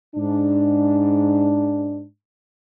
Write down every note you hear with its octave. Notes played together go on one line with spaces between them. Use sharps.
G#2 D4